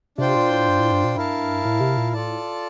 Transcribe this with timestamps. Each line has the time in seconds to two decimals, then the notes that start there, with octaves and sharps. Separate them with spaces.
0.18 C3 D4 F4 C5 G5
0.35 A#2
0.51 A2
0.68 G2
0.79 A2
0.91 G2
1.04 A#2
1.16 G2 E4 A#4 F5 A5
1.65 A2
1.80 C3
1.97 A#2
2.13 A2 F4 A4 D5 A5